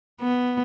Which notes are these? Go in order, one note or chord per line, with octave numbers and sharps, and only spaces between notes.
B3